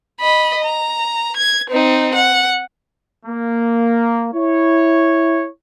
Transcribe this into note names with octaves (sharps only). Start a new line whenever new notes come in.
D#5 B5
A#5
G#6
C4 D#4
F#5
A#3
E4 C#5